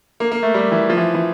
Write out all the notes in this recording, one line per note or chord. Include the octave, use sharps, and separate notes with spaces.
A#3
A#3
A3
G3
E3
F3
E3
E3